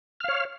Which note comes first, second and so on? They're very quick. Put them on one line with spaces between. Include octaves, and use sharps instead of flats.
F6 F5 C#5